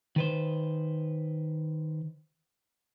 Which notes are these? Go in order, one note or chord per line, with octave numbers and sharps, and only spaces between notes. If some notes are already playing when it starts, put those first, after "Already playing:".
D#3 B4 C5